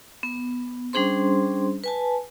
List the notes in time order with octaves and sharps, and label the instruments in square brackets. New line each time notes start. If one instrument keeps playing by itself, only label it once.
[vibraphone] B3
G3 C#4 D4 G#4 C5 C6
B4 G#5 A5